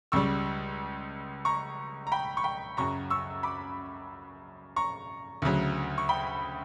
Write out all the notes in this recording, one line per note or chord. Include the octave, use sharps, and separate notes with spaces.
C#2 C#3 G3 C#6 E6
A#5 C#6
A#5
G5 B5
C#6
G5 B5
F#2 C#3 F#3 A#5 C#6
C#6 E6
B5 D6
A#5 C#6
D2 C#3 F#3
C#6
G5 B5